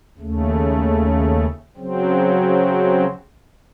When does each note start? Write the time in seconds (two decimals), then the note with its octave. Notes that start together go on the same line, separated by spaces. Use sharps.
0.18 D#2 C#3 A3
1.77 C#3 F#3 C4